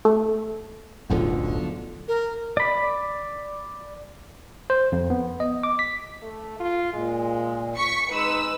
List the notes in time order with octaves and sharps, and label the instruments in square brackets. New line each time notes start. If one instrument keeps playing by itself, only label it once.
[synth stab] A3
[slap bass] D1 B1 F#2 [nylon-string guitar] D3 F3 F#4
[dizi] A#4
[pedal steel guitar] D5 B5
[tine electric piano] C5
F2
B3
D#5
D6
B6
[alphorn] A3
F4
[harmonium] A#2 [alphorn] G#3
[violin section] C#6 B6 C#7
[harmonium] G#3 [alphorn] D#4 [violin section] B4 E6